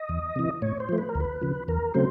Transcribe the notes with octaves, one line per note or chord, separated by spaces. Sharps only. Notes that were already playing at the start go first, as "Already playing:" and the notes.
Already playing: D#5
E2
C3 E3
A2 C#5
C5
F3 A3
B4
A#4
D2
B4
C#3 F3
E2 A#4
C#3 F#3 A3 C4 C5